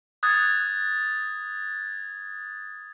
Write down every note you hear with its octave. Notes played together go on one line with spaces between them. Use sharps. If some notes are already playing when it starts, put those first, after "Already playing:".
D#6 F#6 G#6 A6